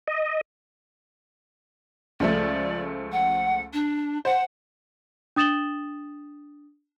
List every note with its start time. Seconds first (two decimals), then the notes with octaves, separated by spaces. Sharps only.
0.07 D#5
2.20 C#2 F3 A3 D5
3.12 F#5
3.73 D4
4.25 C5 F#5
5.36 D4 D#6 A6 E7 F#7 G7